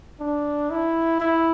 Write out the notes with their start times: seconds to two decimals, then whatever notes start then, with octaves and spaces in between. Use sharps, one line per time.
0.20 D4
0.70 E4
1.20 E4